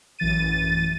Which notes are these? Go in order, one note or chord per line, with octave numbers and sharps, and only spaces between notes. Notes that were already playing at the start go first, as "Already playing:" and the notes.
A1 F#2 E3 A6 D#7